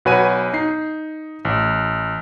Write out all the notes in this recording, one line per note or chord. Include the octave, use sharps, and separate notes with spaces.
B1 F#4 B4 C#5 G#5 D#7
D#4 C7
A1